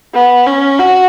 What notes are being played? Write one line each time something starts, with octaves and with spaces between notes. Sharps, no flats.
B3
C#4
F#4